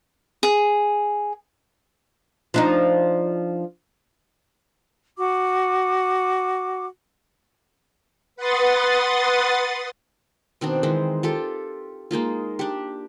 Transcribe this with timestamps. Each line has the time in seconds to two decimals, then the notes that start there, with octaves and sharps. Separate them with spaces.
0.43 G#4
2.54 F3 D4 D#4
5.16 F#4 D6
8.36 B4 F#5 C6 D#6 A6
10.61 B2 D#3 C4 D4
10.83 D#3 E3 G#3 C5
11.23 F4 G4 A4
12.11 G#3 A#3 D#4 F4
12.59 D4 G4